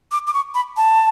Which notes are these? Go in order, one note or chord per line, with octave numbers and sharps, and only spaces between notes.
D6
D6
C#6
B5
A5